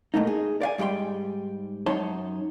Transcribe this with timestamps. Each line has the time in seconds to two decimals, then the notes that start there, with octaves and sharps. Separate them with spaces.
0.14 B2 A3 A#3 D#4
0.27 G#4
0.61 D5 F5 G#5
0.78 G#2 G3 E4 G5 C6
1.86 F#2 D#4 C#5 A5 C6